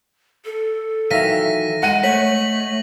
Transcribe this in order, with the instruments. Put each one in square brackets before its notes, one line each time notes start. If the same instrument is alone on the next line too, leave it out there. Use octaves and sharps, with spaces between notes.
[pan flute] A4
[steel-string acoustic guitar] D#3 E3 F#3 [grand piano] E5 F5 [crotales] A#6 B6 D#7
[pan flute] G#3 [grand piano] F#5 D#7
[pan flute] A3 [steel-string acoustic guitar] C#5 D#5 [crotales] B6 F#7